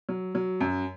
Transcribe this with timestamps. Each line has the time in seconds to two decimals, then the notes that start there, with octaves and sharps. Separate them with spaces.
0.09 F#3
0.35 F#3
0.61 F#2